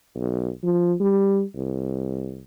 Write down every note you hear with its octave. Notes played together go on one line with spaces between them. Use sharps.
B1
F3
G3
C2